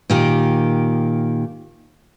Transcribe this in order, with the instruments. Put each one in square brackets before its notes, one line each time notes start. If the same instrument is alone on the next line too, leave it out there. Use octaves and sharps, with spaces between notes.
[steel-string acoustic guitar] A#2 D#3 G4